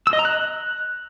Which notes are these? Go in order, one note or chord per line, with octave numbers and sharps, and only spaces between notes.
E6
D#5
A#5
F#6